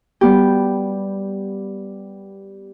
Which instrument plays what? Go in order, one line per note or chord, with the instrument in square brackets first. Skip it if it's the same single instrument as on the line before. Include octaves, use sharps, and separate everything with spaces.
[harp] G3 B3 G4